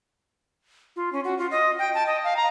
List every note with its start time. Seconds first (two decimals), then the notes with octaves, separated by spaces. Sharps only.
0.96 F4
1.12 C#4
1.24 F#4
1.38 F4
1.51 D#5
1.79 G5
1.94 A5
2.06 D#5
2.24 F5
2.37 A#5